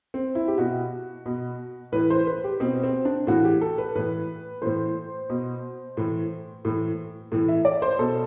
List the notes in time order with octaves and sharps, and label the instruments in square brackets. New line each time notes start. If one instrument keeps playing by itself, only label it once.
[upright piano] C4
E4
G4
B2 F#4
B2
A2 E3 B4
C5
B4
G4
B2 C4
C4
D4
A2 E3 F#4
G4
A4
B4
A2 E3 B4
A2 E3 C5
B2
A2 E3
A2 E3
A2 E3
E5
D5
C5
B2 A4